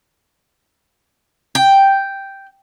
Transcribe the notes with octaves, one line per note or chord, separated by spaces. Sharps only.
G5